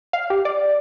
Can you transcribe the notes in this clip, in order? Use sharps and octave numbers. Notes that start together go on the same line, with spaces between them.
F5
G4
D5